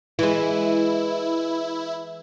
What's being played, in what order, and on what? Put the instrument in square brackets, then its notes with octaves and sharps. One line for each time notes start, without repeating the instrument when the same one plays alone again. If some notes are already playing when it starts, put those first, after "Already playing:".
[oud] E3 G#3 [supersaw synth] E4